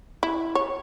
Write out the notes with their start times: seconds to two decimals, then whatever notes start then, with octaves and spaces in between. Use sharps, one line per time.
0.23 E4
0.55 C#5